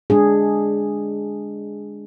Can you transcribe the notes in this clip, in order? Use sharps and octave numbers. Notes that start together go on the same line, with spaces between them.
G#3 D4 G#4